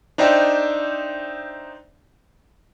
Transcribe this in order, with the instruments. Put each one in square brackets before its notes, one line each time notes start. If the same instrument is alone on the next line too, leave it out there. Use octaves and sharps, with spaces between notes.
[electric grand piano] D4 D#4 C5 E5 G5